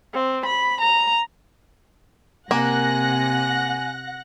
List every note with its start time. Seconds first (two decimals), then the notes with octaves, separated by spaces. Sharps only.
0.14 C4
0.46 B5
0.81 A#5
2.51 C3 A#3 F#5 G#5 F#6 A#6